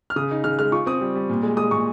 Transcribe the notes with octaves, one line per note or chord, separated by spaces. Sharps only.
F6
C#3 D#6
D#4
C#3 F6
G#3 F6
F4 C#6
C4 D#6
G3
G3
A#2
G#3
G#3 D#6
A#2 C#6